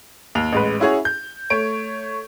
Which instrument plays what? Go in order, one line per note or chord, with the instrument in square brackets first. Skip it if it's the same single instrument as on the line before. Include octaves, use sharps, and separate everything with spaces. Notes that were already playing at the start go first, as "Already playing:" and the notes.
[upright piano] D#2 F7
A1 G#3 B4
C#4 E4 F#4 G#4 C#5
G6
A3 C#5 D7